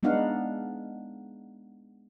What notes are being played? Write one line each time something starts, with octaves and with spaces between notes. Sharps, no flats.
G#3 B3 D4 D#4 F5 F#5